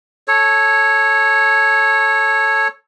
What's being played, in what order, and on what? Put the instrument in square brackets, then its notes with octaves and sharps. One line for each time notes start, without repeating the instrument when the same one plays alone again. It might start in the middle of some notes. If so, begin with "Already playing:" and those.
[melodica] A4 C#5